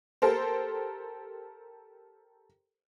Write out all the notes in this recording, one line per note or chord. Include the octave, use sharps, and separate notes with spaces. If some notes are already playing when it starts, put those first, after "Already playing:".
G4 A4 A#4 C5